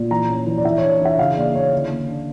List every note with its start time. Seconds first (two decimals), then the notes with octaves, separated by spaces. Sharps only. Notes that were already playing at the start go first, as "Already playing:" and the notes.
Already playing: A#2
0.10 E3 A#5
0.28 C#4
0.46 E3
0.58 D5
0.65 E3 E5
0.78 D4 C#5
1.01 E3 E5
1.19 C#3 F5
1.36 A#3 D5
1.55 C#4 C#5
1.73 D3
1.90 A#3
2.08 D4